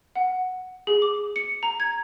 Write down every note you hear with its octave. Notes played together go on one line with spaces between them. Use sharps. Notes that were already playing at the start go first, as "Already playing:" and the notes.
F#5
G#4
D6
C#7
A#5
G#6